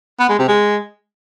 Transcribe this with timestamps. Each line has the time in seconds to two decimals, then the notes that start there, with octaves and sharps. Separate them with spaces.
0.20 B3
0.29 G#3
0.39 C3
0.48 G#3